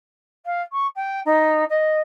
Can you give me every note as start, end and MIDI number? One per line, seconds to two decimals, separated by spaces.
0.45 0.61 77
0.72 0.86 85
0.95 1.20 79
1.25 1.64 63
1.69 2.00 75